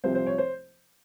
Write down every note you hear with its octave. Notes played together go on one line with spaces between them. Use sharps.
C2 C3 F3 C4 C5
C5
C#5
C5